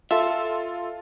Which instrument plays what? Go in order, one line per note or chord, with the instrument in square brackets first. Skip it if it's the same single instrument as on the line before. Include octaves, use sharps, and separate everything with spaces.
[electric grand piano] F4 A4 [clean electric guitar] E5 [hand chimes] F5 A5 C6